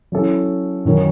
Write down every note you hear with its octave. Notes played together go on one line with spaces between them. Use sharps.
F#3 C#4 E4 A4
F#2 D#3 F#3 C#4